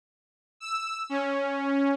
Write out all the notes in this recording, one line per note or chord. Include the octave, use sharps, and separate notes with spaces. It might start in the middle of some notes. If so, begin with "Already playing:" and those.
E6
C#4